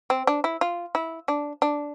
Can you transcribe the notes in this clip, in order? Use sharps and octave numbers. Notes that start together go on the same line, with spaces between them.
C4
D4
E4
F4
E4
D4
D4